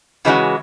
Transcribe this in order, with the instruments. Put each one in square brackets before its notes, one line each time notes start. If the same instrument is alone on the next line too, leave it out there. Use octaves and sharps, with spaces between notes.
[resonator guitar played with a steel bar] C#3 E3 G#3 C#4 F#4